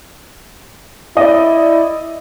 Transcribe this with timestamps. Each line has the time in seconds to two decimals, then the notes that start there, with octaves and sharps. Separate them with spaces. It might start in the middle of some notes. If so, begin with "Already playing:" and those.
1.17 E4 D5 D#5